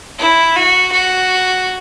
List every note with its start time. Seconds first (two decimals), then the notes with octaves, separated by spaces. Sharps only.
0.19 E4
0.56 F#4
0.92 F#4